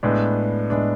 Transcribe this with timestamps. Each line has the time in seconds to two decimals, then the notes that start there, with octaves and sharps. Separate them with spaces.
0.03 A2 G#3 B3 D4
0.70 A2 G#3 B3 D4